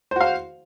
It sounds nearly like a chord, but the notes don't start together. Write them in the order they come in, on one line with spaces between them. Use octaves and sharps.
C5 F#4 F5